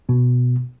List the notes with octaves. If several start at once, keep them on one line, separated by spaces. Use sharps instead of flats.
B2 B3